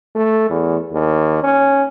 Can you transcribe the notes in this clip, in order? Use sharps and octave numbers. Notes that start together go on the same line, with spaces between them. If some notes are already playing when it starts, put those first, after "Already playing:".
A3
E2
D#2
C#4